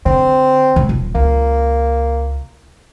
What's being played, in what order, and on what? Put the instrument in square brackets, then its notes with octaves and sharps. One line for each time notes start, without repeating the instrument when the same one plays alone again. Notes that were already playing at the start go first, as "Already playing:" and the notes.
[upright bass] D3 [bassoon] C4
[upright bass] G#2 C#3
D#1
[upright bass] C#2 [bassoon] A#3